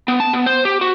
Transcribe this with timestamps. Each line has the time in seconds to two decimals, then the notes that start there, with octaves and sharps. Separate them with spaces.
0.08 B3
0.20 A5
0.33 B3
0.46 C5
0.65 G4
0.81 F#4